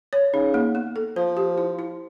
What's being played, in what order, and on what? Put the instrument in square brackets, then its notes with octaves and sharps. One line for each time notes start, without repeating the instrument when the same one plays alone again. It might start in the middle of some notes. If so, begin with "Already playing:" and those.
[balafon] C#5
[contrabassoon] C#3 [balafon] D#4
[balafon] A#3
B3
A4
[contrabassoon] F3 [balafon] C5
[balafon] G4
E4
E4